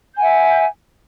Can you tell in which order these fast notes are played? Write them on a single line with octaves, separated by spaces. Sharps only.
G6 G#5 F#5 E5